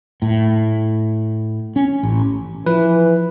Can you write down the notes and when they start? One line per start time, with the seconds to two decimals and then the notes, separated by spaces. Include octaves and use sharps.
0.22 A2
1.76 C#4
2.03 A1
2.66 E3 F3 B4